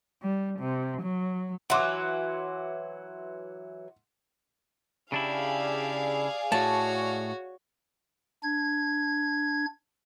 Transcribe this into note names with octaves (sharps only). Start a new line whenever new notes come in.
G3
C3
F#3
E3 F#3 F#5 C6 D6
C#3 D4 E4 G4 G#4 D5 F5
A2 F#4 C#5 A5
D4 G#6